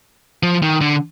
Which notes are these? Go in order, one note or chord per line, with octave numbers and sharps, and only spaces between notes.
F3
D#3
D3